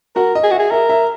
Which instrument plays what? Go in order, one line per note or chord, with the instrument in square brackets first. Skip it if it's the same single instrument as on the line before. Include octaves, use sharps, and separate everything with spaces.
[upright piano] F#4 F#5 [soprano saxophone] A#4
[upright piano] D#5
[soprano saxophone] G#4
[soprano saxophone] F#4 [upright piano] E5
[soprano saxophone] G#4
[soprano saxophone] A#4 [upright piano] E5
[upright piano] E5